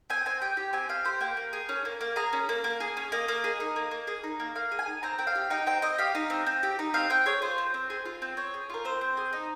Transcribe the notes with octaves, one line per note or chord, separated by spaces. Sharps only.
C4 G#5
C4 G#5
G4 G5
G4
C4 G#5
C4 F5
G4 C5
A#3 G5
A#3
G#4
C#4
A#3
A#3
G#4 A#5
C#4
A#3
A#3
G#4
C#4
A#3 D#5
A#3
G#4
D#4
A#3
A#3
G#4
D#4
A#3
A#3 F5
G#4
G#5
D#4
C4 A#5
C4 G5
F5
G4
D#4 G5
C4 G5
C4 D#5
G4 F5
D#4
C4
C4
G4
D#4
C4 F5
C4 G5
G#4 C#5
F4 C5
C4
C4
G#4
F4
C4
C4 C#5
G#4
F4 A#4
C4 C5
C4
G#4
D#4